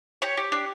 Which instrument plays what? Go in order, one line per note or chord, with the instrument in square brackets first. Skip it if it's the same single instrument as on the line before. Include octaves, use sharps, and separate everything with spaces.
[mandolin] G4 C#5
G4
D4